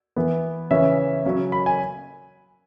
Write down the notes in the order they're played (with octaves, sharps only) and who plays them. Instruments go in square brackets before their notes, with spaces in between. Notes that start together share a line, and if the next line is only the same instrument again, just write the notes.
[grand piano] E3 B3
C#3 E3 C#4 E5
C#3 F#3 C#4
B5
G#5